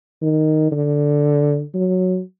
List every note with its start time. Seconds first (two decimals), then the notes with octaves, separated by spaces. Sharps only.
0.21 D#3
0.72 D3
1.74 F#3